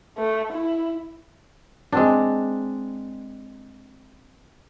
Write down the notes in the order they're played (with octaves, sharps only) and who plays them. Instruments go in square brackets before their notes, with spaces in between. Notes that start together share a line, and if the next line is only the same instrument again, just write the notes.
[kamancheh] A3
E4
[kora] G#3 C4 D4